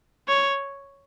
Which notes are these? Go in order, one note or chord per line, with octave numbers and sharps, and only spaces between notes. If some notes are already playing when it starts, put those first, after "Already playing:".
C#5